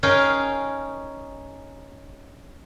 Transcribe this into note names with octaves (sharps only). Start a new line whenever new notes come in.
C#4 D#4 G#4 A#4 F5 G5